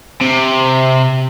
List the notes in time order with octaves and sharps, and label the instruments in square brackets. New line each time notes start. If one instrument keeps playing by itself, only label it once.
[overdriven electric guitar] C3